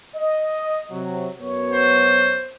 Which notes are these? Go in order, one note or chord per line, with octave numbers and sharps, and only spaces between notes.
D#5
C3 F#3
F#2 B3 C#5
C5